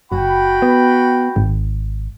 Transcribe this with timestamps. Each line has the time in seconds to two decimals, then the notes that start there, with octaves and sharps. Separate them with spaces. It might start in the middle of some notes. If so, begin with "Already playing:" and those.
0.12 F#1 F#4 G5 B5
0.62 B3
1.36 G#1